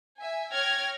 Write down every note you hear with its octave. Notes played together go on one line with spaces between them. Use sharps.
E5 G#5
C#5 G5 F6 G#6 A#6